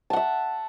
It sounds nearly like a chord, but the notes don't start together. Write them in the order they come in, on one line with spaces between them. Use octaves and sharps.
A5 F#5 E5